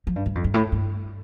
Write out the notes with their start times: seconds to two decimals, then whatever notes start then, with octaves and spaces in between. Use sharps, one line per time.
0.07 F3
0.16 G2
0.26 G2
0.35 F2
0.44 G2
0.54 A2
0.72 G2